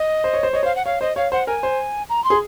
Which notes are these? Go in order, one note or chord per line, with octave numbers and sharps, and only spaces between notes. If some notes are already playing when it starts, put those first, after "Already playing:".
Already playing: D#5
C5
C#5
C5
C#5 D#5
C5 F5
F#5
C#5 F5
C5 D#5
C#5 F5
C5 F#5
A#4 G#5
C5
A#5
C6
G#4